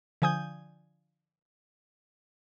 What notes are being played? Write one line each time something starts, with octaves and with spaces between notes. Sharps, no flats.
D3 F3 G#5 D#6 G6